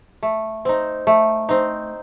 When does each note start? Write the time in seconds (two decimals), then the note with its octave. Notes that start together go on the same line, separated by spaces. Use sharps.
0.23 A3
0.65 C4 D#4
1.07 A3
1.49 C4 D#4